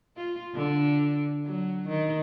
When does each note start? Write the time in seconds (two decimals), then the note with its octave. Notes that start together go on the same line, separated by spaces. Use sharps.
0.17 F4
0.54 D3
1.45 F#3
1.88 D#3